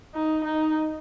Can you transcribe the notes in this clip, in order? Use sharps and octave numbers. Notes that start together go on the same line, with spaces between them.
D#4
D#4